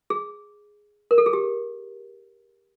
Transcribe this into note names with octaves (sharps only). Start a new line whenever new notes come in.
G#4
A#4
A4
G#4
G4